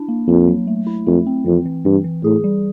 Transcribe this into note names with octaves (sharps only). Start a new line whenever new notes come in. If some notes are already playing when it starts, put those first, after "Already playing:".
Already playing: D4 E4
A#3
F2 A#3
F#3
A3
E4
F2 A3
C4
F2 E3
E3
G2 E3
E3
A2 G#4
G3